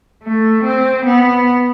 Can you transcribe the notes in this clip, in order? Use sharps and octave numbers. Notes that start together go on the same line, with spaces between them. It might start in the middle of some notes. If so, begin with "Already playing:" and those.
A3
C4
B3